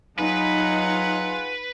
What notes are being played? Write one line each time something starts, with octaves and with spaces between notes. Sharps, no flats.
F#3 D#4 F4 G#4 B4 F#5